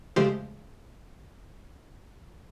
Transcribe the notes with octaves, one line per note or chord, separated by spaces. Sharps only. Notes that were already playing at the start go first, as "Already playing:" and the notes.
C#3 F3 G#3 A3 G4 C5